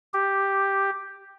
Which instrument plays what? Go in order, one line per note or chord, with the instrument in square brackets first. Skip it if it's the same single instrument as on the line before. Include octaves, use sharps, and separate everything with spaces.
[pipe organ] G4